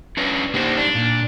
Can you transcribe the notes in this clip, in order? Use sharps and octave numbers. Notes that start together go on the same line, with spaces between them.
C#4 D4 B4
G3 A#3 D4 D#4 C5
D4
A#2